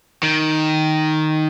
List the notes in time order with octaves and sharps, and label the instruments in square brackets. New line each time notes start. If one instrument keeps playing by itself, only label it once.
[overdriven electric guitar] D#3